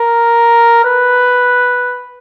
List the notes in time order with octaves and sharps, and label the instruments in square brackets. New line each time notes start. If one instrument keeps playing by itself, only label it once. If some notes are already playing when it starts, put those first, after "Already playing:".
Already playing: [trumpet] A#4
B4